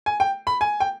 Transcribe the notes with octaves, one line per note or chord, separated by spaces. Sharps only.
G#5
G5
B5
G#5
G5